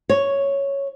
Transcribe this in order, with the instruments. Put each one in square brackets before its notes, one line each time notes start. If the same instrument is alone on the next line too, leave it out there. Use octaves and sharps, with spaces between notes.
[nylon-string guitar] C#5